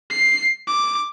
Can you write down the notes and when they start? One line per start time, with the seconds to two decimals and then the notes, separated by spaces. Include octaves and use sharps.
0.10 C7
0.67 D6